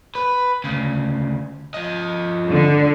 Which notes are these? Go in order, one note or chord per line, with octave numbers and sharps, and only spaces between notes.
B4
D2 C#3
F3 D#5
D3